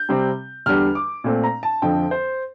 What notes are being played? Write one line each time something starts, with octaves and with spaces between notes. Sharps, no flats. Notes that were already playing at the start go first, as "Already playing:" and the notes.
Already playing: G6
C3 G3 C4
E2 D3 G3 D4 F6
D6
A#2 A3 C4
A#5
A5
F2 D3 F3 C4 G5
C5